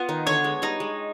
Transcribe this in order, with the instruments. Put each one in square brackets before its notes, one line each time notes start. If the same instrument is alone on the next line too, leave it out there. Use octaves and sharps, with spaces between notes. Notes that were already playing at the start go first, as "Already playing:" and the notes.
Already playing: [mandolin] B3 [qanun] F4
[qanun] D#3 D#4
[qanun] D3 D4 [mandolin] C#5
[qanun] G#3
[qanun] G3 [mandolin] D#4
[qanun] G#3